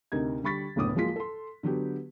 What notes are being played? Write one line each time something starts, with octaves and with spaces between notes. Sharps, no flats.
D2 C3 D#4 A#4 G#6
D3 G3 B5 C#6 A6 B6
F#1 D2 A2 B3 D6 D#6
F3 F#3 G#3 A#3 F4 B6
A4 C6
D3 F#3 B3 G4